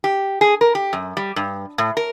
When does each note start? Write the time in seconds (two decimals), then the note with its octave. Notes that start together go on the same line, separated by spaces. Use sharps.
0.04 G4
0.41 G#4
0.61 A#4
0.75 G4
0.93 F#2
1.17 G3
1.36 G2
1.78 A2
1.97 A#4